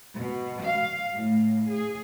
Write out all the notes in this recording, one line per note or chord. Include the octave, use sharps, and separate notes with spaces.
B2
F5
A2
G#4